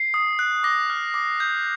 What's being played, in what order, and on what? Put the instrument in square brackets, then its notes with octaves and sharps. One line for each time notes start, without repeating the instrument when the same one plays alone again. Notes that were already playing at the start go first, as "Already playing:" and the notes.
Already playing: [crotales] C7
D#6
F#6
D6 A#6
F6
D6
G6